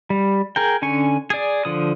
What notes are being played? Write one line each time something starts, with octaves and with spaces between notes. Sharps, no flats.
G3
G#4 A#4 G5
D3 C#4 G#5 C#6
G#4 D5
D3 F3 D#6